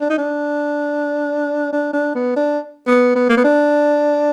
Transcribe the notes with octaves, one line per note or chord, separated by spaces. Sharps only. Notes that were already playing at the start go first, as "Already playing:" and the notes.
D4
D#4
D4
D4
D4
B3
D4
B3
B3
A#3
B3
D4